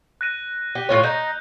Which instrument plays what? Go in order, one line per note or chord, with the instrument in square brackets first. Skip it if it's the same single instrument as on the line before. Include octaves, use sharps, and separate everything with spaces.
[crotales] F#6 A#6 D#7
[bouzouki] G4
A2 F4 C#5
[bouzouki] D#4 [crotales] G6 D#7